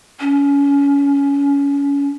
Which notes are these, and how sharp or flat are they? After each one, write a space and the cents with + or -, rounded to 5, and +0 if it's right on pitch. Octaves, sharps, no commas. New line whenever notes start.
C#4 +25